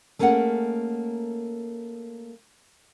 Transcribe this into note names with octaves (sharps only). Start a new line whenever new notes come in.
A3 A#3 C#4 G#4 A#4 F#5